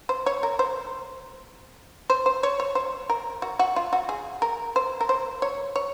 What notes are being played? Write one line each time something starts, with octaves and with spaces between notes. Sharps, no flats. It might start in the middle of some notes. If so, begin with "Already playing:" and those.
C5
C#5
A#4
C5
C5
C5
C#5
C#5
C5
A#4
F#4
F#4
F4
F#4
G#4
A#4
C5
A#4
C5
C#5
C#5